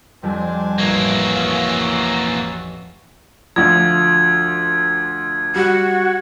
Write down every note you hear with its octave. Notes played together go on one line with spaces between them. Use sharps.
F2 G3 C4 D4 G#5
A1 E3 A#3 C#4 F#4 E5 A5 G#6
F5 C7 C#7
D2 F3 G#6
G3 F#4